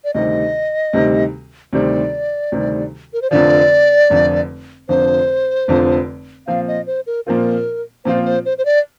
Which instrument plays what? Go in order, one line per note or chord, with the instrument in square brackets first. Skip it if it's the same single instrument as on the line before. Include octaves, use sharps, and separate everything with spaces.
[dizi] D5
[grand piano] D2 C3 D#3 G3 C4 [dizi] D#5
[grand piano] D2 C3 D#3 G3 C4
[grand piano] D2 C3 D#3 G3 C4 [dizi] D5
[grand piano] D2 C3 D#3 G3 C4
[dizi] A#4
C5
[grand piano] F1 F2 D3 F3 [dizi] D5
[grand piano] F1 F2 D3 F3
[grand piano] F1 F2 D3 F3 [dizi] C5
[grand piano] F1 F2 D3 F3
[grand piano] A#2 F3 C4 F4 [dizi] F5
[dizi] D#5
C5
A#4
[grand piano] A#2 F3 C4 F4 [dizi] A#4
[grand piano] A#2 F3 C4 F4 [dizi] C5
[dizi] C5
C5
C5
D5